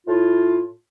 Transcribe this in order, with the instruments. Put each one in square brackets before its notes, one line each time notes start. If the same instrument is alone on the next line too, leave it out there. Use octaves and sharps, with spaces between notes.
[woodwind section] A2 E4 F4